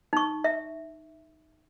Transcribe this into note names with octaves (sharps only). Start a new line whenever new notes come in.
D#4 C#6
E5